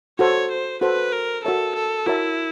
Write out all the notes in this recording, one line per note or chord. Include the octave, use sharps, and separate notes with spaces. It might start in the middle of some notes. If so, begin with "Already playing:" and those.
F#4 A4 C5 C#5
C5
F#4 A4 B4 C5
A#4
F#4 A4 A#4 C#5 E5 A5
A4
E4 F#4 A#4 C#5 E5 A5